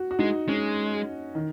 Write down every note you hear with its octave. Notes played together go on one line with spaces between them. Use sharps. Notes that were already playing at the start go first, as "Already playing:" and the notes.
Already playing: F#4
F#4
G#3 D#4
G#3 C#4
D#3